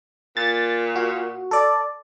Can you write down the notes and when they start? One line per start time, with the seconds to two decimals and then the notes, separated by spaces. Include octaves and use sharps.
0.37 A#2 A6
0.96 F#4
1.51 A4 D5